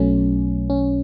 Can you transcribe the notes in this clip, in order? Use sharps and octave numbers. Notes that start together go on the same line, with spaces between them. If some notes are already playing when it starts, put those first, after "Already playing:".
Already playing: B1 B2 F#3 A3 C#4
C#4